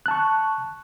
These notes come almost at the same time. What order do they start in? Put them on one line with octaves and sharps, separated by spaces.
F#6 A5 C#6